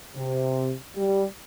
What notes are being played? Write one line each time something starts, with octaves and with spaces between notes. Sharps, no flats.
C3
G3